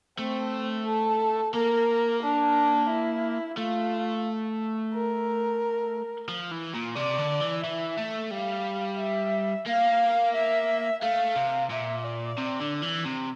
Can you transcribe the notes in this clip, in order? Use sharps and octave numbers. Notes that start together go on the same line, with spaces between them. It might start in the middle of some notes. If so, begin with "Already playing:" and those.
A3 C4
A4
A#3 A#4
D4
E4
A3 F4
A#4
F3
E3
A#2
C3 D5
D3
E3
E3 E5
A3
G3 F5
E5
A#3 F5
E5
A3 F5
C3
A#2 E5
D5
C3
D3
E3
C3